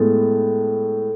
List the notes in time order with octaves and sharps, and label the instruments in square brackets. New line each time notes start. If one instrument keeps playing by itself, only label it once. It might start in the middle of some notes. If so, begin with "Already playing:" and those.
Already playing: [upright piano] A2 G#3 B3 [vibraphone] A4